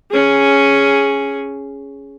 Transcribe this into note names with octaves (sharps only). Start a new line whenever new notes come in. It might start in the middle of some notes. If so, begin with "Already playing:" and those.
C#4 G#4